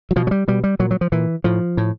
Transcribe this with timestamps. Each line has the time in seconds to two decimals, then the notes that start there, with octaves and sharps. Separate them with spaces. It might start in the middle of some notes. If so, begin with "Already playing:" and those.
0.11 F#3
0.16 B2 F3
0.27 F#3
0.31 G3
0.48 B2 G3
0.64 G3
0.79 A#2 F#3
0.91 F#3
1.01 F3
1.12 A#2 E3
1.44 A2 F3
1.77 A2